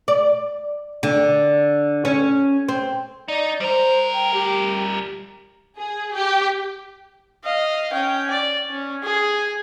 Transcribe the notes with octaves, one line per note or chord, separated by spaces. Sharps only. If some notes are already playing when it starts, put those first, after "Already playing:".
D5
D3
C#4
C4
D#4 D5
G3 A#4 C5
G5
G4
G#4
G4
D#5 F5
C#4 G5
D5
C#4
G#4